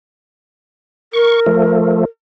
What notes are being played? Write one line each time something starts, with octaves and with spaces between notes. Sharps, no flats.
A#4 C#6
F3 A3